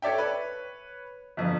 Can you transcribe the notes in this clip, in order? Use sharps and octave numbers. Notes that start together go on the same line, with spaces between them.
A4 C#5 D5 E5 G5
B4 C#5
G1 F2